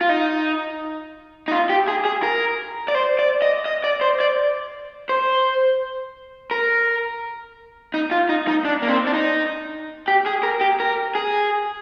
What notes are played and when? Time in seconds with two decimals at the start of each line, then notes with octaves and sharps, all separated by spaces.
0.01 F4
0.09 D#4
1.48 D#4
1.52 F4
1.70 G4
1.88 G#4
2.05 G#4
2.23 A#4
2.88 D5
2.95 C5
3.19 D5
3.42 D#5
3.66 D#5
3.84 D5
4.01 C5
4.20 D5
5.09 C5
6.51 A#4
7.94 D#4
8.11 F4
8.29 D#4
8.48 D#4
8.65 D4
8.82 A#3
8.89 C4
9.07 D4
9.13 D#4
10.08 G4
10.26 G#4
10.43 A#4
10.61 G4
10.80 A#4
11.15 G#4